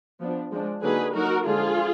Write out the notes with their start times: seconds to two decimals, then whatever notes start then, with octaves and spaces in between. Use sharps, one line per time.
0.20 F3 B3 D4
0.51 F3 G#3 D4
0.82 D3 F#3 A#3 D#4 G#4 B4
1.14 F#3 A#3 D#4 F#4 A#4
1.46 D3 F3 G#3 F4 G#4